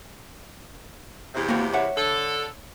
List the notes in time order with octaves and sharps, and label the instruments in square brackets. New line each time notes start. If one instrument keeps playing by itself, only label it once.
[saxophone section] E2 C3
[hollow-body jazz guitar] A#3 F#4 G4
C#5 E5 F#5
[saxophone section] D3 A4